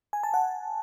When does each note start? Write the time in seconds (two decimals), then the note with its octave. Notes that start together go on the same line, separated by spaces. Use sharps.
0.13 G#5
0.23 A5
0.34 F#5